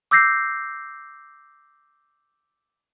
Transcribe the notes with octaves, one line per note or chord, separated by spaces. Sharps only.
D6 E6 G6 A#6 C7